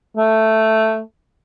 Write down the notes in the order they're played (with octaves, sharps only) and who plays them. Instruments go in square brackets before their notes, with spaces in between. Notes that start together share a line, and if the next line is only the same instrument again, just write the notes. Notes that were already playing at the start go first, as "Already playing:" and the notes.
[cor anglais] A3